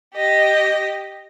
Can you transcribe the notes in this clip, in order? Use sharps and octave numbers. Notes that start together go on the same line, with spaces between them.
G4 D#5